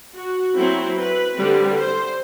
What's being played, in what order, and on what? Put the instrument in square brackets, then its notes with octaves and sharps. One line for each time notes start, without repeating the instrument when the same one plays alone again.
[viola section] F#4
F#3 C4 E4
B4
D3 G3 C4
C5